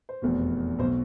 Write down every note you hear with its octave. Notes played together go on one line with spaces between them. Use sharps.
C5
F1 E2 B2
B1 B2 C5